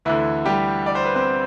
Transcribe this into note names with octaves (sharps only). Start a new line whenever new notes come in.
D2 D3 E3 E4
G3 G4
D5
C5
B4
C4 C5